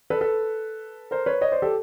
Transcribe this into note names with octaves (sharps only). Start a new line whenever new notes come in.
A4 B4
A4 B4
A#4 C5
B4 C#5
C#5 D#5
C5 D5
G4 A4